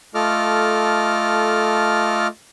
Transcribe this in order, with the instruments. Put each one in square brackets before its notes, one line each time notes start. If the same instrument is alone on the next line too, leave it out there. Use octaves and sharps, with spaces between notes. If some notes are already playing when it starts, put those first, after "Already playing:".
[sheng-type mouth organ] A3 F4 A4 D#5 D6 F6